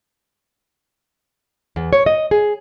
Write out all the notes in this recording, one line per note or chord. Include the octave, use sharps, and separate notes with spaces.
E2
C#5
D#5
G#4